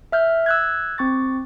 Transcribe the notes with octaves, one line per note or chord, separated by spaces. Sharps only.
E5 F6 G6
E6 F#6 G#6
C4 C#6 A6